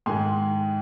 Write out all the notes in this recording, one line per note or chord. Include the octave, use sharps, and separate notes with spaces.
G#2 D#3 G#3 G#5 C6